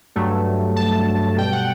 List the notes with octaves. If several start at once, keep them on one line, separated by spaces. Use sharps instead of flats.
G2 F#3 A3
A5
B2 G3 G5
F#5